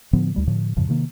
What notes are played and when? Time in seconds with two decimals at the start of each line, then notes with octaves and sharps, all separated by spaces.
0.13 A2 D3 F3 B3
0.34 D2 G3 A3
0.47 A2 D3 F3
0.77 F2 G#2 C#3 F3
0.89 C3 D#3 A#3